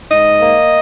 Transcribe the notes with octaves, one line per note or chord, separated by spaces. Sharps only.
G#2 D#5
A#3